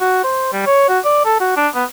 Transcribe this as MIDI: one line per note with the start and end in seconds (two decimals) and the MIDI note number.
0.01 0.21 66
0.24 0.48 72
0.53 0.66 55
0.67 0.89 73
0.89 0.99 66
1.05 1.23 74
1.26 1.36 69
1.40 1.55 66
1.57 1.68 62
1.75 1.84 59